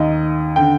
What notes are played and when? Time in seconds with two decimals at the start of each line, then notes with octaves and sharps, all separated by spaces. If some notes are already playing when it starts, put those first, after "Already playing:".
Already playing: D#2 D#3 D#5
0.56 D3 G5